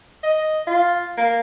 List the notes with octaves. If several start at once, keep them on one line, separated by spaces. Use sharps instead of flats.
D#5
F4
A#3